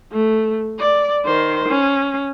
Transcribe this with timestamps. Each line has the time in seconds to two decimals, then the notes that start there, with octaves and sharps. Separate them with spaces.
0.12 A3
0.79 D5
1.25 D#3 C5
1.69 C#4